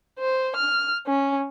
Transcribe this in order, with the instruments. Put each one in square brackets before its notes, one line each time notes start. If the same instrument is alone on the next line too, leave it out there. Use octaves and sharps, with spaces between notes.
[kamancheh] C5
F6
C#4